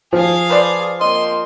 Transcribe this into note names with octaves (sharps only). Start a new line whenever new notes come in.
F3 G#4 F5
B4 C5 D5
A#3 C4 D#5 C6